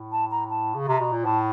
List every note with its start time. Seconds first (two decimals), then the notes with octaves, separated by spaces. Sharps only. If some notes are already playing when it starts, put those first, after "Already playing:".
Already playing: A2
0.12 A5
0.31 A#5
0.50 A5
0.75 C#3
0.87 C3 A#5
1.00 B2
1.12 A#2
1.25 A2 A5